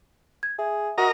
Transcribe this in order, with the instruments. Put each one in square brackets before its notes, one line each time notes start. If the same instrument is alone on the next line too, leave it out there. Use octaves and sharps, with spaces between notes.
[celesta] G#6
[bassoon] G#4 [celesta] E5
[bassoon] F#4 [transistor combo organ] A#4 D#5 A#5